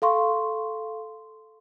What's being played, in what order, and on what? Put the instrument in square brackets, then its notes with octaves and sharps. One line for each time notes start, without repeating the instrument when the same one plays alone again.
[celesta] A4 F5 C6 C#6